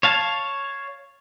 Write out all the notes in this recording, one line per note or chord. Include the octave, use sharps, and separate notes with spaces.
C#5 F5 A5